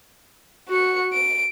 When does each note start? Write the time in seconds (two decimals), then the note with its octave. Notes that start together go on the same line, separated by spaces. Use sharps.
0.69 F#4 C#7
1.13 D7